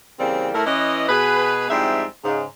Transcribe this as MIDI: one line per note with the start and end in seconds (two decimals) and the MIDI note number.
0.19 0.49 49
0.19 0.49 52
0.19 0.49 55
0.19 0.49 58
0.19 0.49 60
0.54 0.63 45
0.54 0.63 57
0.54 0.63 64
0.54 0.63 70
0.66 1.05 52
0.66 1.05 61
0.66 1.05 64
0.66 1.05 71
0.66 1.05 75
1.09 1.69 47
1.09 1.69 68
1.09 1.69 71
1.70 2.04 41
1.70 2.04 44
1.70 2.04 55
1.70 2.04 60
1.70 2.04 64
1.70 2.04 76
2.24 2.44 44
2.24 2.44 49